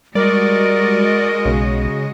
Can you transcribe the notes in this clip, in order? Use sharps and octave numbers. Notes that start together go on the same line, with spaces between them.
G3 G#3 F#4 A#4 D5 D#5
B1 C#3